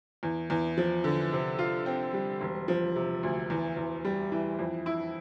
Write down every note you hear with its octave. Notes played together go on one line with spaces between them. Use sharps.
E2
E2
F3
D3
C3
F4
C4
G3
E1
F3
C3
D2
E2
E2
G3
E3
F2
E4